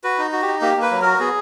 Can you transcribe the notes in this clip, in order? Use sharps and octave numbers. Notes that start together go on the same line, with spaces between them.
F#4 B4
D#4
F#4
G4
D#4
A#3 G4
A#3 B4
F#3
F#4 A#4
B3 G#4